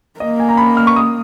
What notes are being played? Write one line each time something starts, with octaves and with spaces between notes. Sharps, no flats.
A#3 D#5
G#5
A#5
B5
F6
C#6
D#6